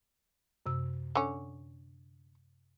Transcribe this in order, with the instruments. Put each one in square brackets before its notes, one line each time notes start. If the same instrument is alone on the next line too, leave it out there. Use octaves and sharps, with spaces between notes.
[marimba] F#2 C3 E6
[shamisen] D3 C#4